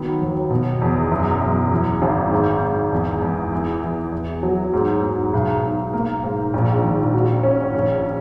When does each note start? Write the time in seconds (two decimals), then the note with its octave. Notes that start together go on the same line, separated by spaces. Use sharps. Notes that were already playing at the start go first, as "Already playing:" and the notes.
Already playing: D#3 F#3 B3
0.21 D#2
0.51 B2
0.82 E2
1.11 F#2
1.41 F#2
1.72 E3
2.02 G#1
2.31 G#2
2.62 G#2
2.93 E2
3.22 E2
3.53 E3
3.83 E3
4.12 E2
4.43 F#3
4.73 G#2
5.03 G#2
5.33 B1
5.63 B1
5.93 A#3
6.23 G#2
6.54 A#1
6.84 D#3
7.14 F#4
7.43 C#4
7.74 A#1